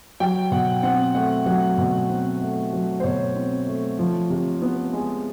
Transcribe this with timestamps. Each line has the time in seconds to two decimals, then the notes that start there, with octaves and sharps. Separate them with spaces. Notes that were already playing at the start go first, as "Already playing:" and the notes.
0.20 F#3 G5
0.51 B2 F#5
0.83 C4 F#5
1.15 A3 F#5
1.46 F#3 F#5
1.78 B2 F#5
2.09 C4
2.42 A3
2.73 F#3
3.00 C5
3.04 B2 C#5
3.36 C4
3.67 A3
3.99 F3
4.30 C3
4.62 B3
4.93 G#3